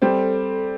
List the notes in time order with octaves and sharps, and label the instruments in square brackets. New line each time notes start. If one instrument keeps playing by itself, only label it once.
[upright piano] G3 C4 [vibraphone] A4